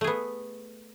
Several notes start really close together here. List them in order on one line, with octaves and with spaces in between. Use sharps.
A3 G#4 B3